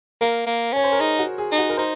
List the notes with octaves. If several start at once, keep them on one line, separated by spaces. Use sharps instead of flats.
A#3 A#4
A#3
C#4 C#5
C5
A#4
D#4 G#4
F#4
G#4
D#4
F#4
A#4
D#4 C5